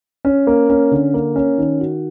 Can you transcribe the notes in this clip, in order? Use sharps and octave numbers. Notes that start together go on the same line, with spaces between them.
C#4
A#3
C#4
D3
A#3
C#4
D#3
F#4